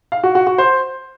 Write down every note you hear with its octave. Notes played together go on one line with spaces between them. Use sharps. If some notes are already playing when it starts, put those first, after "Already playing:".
F5
F#4
F#4
F#4
C5